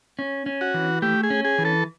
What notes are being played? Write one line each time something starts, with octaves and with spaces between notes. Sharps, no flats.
C#4
C#4
F#4
E3
A3 G4
G#4
C#4
G#4
E3
A4